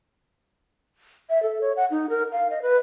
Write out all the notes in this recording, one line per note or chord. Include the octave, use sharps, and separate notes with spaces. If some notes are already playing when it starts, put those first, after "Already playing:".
E5
A4
C#5
F#5
D#4
A#4
F5
D#5
B4